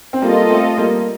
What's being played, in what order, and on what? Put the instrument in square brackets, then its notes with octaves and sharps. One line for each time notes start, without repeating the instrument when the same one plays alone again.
[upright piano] C4
[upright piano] G3 A#3 [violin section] F4 A4 D#5
[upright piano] A3 C4
G3 A#3